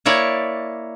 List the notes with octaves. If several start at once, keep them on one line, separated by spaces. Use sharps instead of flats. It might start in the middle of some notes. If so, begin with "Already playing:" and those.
A#3 E4 C#5 D5